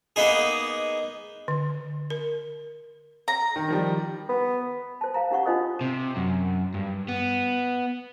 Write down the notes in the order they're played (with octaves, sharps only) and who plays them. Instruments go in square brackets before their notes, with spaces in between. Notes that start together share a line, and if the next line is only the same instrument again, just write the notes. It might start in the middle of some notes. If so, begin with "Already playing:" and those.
[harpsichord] A#3 B3 D#4 G#4
[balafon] D3
A#4
[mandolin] A#5
[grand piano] D#3
D#3 F3 G3
[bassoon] B3
[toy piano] C5 A5
C5 F5 A#5
C#4 D#4 G4 F#5 C#6
D4 F4 C5 D#5 D#6
[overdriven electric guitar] C3
F#2
G2
B3